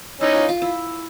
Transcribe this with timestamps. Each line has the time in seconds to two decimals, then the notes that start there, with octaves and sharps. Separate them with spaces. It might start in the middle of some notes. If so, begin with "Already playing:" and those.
0.21 C#4 D#4 E4
0.35 F4
0.49 F4
0.62 E4